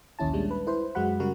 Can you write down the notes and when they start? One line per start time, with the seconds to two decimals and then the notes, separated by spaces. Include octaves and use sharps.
0.19 A#1 D#2 C#4 E4 A5
0.33 A#2 G3 G#3 D4
0.51 B4
0.67 E4 B4 C5
0.95 F#2 G#3 F#4 F#5 B5
1.20 C#3 G3 F#4 A#4